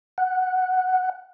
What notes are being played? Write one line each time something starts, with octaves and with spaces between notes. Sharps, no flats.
F#5